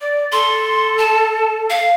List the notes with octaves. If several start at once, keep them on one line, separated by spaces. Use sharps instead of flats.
D5
A4 C6
A5
F5